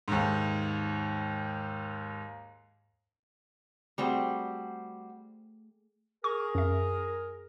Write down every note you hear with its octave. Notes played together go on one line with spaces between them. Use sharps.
D#2 G#2
G3 A3 C4 F#4 G#4 G5
G#4 A#4 C#6
F#2 E5